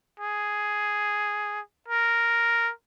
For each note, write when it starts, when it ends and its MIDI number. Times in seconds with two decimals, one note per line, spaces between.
0.20 1.60 68
1.88 2.71 70